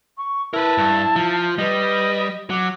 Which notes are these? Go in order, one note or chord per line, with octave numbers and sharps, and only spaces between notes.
C#6
E4 A#4 B4 A5
G2
F3
G3 B4 D#5
F#3 D6